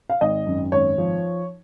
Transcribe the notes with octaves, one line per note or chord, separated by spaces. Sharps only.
F5
G#1 D#5
F#2
G#1 C#5
F3